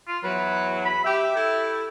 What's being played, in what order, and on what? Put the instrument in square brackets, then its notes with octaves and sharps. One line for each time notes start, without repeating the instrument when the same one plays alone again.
[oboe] F4
[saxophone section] E2 F#3 [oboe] B4
[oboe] B5
[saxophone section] G4 [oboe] E5
[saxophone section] E4 G4 A4